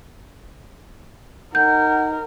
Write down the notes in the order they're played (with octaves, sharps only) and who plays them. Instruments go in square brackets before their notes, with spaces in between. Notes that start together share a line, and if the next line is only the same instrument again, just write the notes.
[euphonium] D#4 [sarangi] A#4 [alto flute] F#5 [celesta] G6